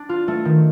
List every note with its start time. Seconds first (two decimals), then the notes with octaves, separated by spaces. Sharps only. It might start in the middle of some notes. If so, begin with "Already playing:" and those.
Already playing: D4
0.09 F4
0.28 A3
0.45 D#3